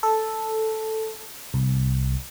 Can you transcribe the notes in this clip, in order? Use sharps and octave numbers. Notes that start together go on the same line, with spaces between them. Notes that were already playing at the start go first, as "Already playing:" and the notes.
A4
C2